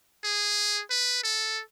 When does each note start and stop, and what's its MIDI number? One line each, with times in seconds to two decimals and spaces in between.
0.24 0.83 68
0.90 1.24 71
1.24 1.62 69